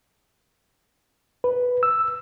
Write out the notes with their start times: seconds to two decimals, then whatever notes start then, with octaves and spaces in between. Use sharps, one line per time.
1.44 B4
1.83 E6